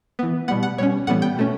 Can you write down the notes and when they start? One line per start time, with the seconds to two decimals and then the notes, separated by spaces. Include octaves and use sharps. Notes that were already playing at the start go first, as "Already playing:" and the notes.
0.19 E3 B3
0.48 B2 G3 B3 F#5
0.63 F#5
0.78 B2 G3 C#4 C#5
1.07 A2 E3 G3 B3 F#5
1.22 G5
1.37 B2 A3 C#4